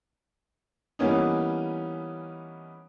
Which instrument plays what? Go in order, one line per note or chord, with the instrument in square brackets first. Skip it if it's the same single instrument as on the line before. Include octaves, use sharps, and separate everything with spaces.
[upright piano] E3 G3 A#3 B3 C#4 D#4